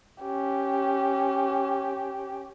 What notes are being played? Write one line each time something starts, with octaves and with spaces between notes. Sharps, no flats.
C#4 G4